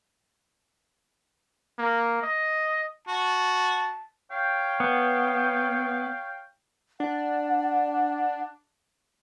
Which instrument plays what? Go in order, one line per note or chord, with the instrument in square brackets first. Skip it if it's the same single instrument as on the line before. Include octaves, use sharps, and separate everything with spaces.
[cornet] A#3
D#5
[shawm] F#4 [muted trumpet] A5
[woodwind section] C#5 F5 G5
[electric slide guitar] B3
[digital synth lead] D4 [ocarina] F#5